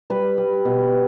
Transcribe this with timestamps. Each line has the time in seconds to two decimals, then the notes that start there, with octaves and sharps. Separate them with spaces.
0.10 G3 B4
0.38 G3
0.65 B2